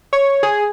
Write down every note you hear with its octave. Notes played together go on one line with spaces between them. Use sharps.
C#5
G#4